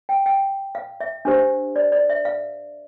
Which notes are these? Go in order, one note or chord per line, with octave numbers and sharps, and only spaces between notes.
G5
G5
F5
E5
D4 G4 C5
D5
D5
E5
F5